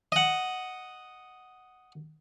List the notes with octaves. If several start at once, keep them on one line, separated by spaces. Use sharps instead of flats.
D#5 F#5